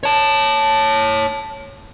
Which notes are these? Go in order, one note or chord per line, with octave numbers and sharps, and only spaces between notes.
C#5 A5